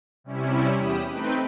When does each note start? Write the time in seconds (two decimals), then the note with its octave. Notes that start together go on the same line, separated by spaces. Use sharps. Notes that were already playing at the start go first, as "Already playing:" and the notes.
0.24 C3 G3 C#4 E4
0.77 E2 G4 B5 D#6 E7
1.09 A3 C4 D#4 B4 G5